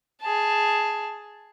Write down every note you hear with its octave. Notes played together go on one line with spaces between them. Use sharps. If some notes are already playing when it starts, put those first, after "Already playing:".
G#4 A5